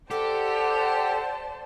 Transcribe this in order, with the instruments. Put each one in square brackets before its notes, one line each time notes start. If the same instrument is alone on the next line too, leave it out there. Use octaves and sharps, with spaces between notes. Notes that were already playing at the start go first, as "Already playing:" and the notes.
[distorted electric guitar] G4 [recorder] A4 [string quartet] C5 D5 A5 [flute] F#5